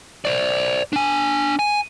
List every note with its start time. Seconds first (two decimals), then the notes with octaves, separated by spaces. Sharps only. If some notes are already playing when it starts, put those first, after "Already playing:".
0.25 C5 D5
0.93 D4 G#5
1.59 G#5